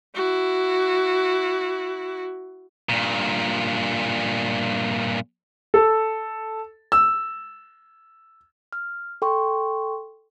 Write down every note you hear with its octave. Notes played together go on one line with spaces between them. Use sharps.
E4 F#4
G2 A#2
A4
E6
F6
A4 G5 C6 C#6